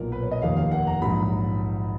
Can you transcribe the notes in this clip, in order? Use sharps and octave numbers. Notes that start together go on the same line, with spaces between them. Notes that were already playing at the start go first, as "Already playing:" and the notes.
Already playing: B1 A#2 F#3 A#4
B4
C#5
D#5
F1 D#2 D#3 A#3 F5
F5
F#5
A#5
A#1 G#2 F#3 B5